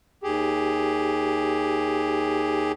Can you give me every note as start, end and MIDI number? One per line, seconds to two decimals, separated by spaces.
0.23 2.72 39
0.23 2.72 67
0.23 2.72 68